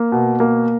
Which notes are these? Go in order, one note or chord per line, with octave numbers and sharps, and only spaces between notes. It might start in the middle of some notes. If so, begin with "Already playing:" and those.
Already playing: A#3
B2
A#3